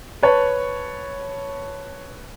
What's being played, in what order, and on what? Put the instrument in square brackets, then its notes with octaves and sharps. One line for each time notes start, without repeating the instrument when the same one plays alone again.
[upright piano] B4 C#5 A5